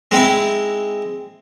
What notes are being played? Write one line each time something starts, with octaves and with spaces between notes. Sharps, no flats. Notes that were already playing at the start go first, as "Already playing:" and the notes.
G#3 C4 D#4 E4